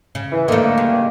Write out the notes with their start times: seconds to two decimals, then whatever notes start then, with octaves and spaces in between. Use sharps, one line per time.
0.15 C#3
0.32 E3
0.48 G2 D3 D#3 A3 A#3
0.78 C#3